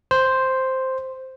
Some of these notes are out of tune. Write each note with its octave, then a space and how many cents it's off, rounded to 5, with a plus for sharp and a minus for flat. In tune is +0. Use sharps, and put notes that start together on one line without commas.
C5 +0